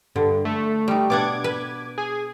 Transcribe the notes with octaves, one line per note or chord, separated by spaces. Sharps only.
G2 D3
A3
G3 D#4
B2 D4 F#5 D6 G#6
B4
G#4 G#5